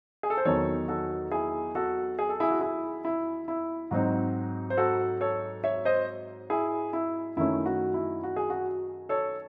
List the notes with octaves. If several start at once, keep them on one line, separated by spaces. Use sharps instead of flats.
G#4
A4
C5
E2 D#3 F#3 A4 C#5
F#4 A4
E4 G#4
F#4 A4
G#4
A4
E4 G#4
F#4
E4 G#4
E4
E4
G#2 F#3 C4 D#4 F#4
C5
F#4 A4
A4 C#5
C#5 E5
C5 D#5
E4 G#4
E4
F#2 D#3 A3 C#4 E4
F#4
E4
F#4
G#4
F#4
A4 C#5